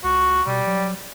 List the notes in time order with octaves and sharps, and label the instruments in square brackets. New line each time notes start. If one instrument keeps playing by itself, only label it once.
[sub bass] C#2 [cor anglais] F#4
[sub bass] B2 [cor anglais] G3
[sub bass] F#3